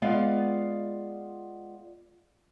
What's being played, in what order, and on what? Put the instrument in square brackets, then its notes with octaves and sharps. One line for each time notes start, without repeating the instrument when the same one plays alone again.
[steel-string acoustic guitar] G#3 B3 F4 D5 F5